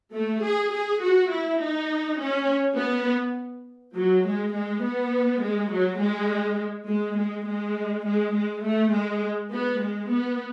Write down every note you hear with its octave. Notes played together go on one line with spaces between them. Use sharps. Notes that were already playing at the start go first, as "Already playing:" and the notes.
A3
G#4
G#4
F#4
E4
D#4
C#4
B3
F#3
G#3
G#3
B3
G#3
F#3
G#3
G#3
G#3
G#3
G#3
G#3
A3
G#3
B3
G#3
B3